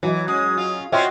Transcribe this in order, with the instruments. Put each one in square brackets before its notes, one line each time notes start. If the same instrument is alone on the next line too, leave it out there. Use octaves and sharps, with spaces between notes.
[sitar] E3 [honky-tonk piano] F#3 D#5
[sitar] G#3 [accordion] C#4 [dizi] D#6
[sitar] F4
[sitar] C4 C#4 [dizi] F4 [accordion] F#4 D#5 C6 [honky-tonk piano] E5 G5